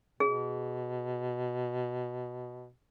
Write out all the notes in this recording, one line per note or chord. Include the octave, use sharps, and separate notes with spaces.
B2 G#4